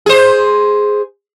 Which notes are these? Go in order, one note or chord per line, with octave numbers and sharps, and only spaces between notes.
G#4 C5